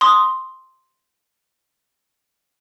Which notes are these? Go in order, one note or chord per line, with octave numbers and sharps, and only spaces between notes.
C6 D#6